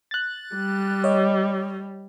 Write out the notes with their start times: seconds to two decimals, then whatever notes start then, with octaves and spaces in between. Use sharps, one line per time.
0.11 F#6 A6
0.55 G3
1.04 C#5 D#5